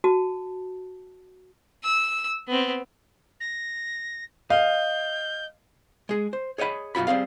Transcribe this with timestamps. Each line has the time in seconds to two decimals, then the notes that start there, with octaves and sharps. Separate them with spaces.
0.04 F#4 A5
1.83 E6
2.47 B3 C4
3.40 A#6
4.50 D#5 F5 G6
6.09 G#3 G#4
6.33 C5
6.58 G#4 C#5 D#5 F#5 B5
6.95 B1 F#2 F4 F#4 B5
7.07 G3 C4 G#4 F5